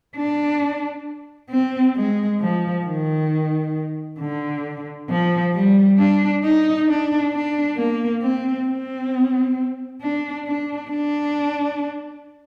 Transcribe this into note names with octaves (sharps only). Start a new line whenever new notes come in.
D4
C4
G#3
F3
D#3
D3
F3
G3
D4
D#4
D4
D4
A#3
C4
C4
D4
D4
D4